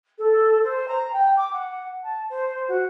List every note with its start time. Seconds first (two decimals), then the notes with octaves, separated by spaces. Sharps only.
0.18 A4
0.63 C5
0.88 A#5
1.12 G5
1.37 D6
1.53 F#5
2.03 A5
2.29 C5
2.68 F#4